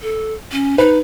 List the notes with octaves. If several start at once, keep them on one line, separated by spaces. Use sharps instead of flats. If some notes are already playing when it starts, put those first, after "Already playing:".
A4
C#4
D#4 B4